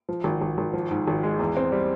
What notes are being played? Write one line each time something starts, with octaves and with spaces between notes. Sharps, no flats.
F3
G#1
G#1
G#1
F3
G#2
G#1
G#3
E2
C4
G3